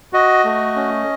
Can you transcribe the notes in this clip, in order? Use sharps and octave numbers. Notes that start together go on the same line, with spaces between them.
F#4 D#5
A3
C#4